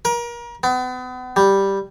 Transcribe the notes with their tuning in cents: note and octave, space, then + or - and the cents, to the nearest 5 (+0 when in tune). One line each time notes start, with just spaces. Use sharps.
A#4 +35
B3 +35
G3 +0